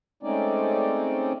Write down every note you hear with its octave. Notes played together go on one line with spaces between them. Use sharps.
G#3 A3 C4 C#4 D#4 D5